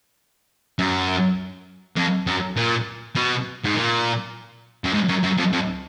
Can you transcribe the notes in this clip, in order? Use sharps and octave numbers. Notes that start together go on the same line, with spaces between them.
F#2
F2
F#2
A#2
B2
G#2
A#2
F#2
G#2
F#2
F#2
F2
F2